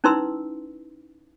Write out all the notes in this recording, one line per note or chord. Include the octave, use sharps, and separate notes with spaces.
C#4 D#4 E4 B4 C6 E6